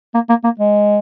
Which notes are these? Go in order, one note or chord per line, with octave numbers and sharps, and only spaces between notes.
A#3
A#3
A#3
G#3